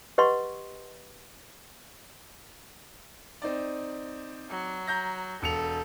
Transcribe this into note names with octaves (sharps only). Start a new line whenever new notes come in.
G4 B4 D#5 F#5 C6 C#6
C4 D#4 D5
F#3
A#5 G6 A#6
E1 A4 C#7 F7